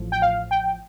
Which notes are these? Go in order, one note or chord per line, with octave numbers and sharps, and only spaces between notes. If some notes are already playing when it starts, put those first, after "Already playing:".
Already playing: A1 A2 F3
G5
F5
G5